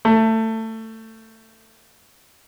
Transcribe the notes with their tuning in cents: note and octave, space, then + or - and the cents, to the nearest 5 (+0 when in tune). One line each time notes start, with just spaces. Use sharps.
A3 +20